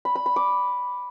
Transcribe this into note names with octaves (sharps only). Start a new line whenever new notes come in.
B5
B5
B5
D6